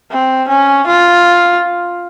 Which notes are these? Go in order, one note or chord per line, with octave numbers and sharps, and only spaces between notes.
C4
C#4
F4